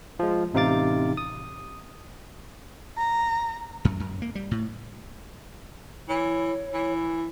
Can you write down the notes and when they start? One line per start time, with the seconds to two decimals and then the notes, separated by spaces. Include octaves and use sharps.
0.19 F3 G#3
0.54 A1 C3 D#4 F5 D6 A6
1.17 D#6
2.97 A#5
3.85 F#2
4.00 F#2
4.22 A#3
4.35 G3
4.51 A2
6.09 E3 C#5
6.74 E3